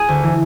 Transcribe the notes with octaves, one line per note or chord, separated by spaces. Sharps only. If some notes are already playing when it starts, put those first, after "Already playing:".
Already playing: G#4
D2
E3